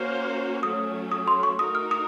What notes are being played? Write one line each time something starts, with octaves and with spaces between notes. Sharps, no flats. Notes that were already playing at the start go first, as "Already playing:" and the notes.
Already playing: A#3 C#4 F#4 C5 F5
F#3 A3 C#4 D#6
D#6
C6
C#6
A3 D#4 F#4 A#4 D#6
F6
D#6